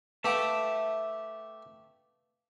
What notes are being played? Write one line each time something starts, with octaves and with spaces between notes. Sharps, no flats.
A3 G4 B4 E5 F5 A5 D7